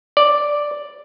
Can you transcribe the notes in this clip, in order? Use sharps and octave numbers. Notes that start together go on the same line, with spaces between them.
D5